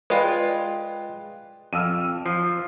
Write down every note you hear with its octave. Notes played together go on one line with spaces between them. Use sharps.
G#3 F4 B4 D5 G5
F2 E6 F6 D#7
F3 C7